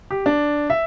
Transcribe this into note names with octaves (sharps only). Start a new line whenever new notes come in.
G4
D4
E5